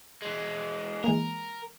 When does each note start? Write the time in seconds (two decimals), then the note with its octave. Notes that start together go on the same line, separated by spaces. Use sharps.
0.22 E3 G#3
1.04 E3 G#3 A#3 A#4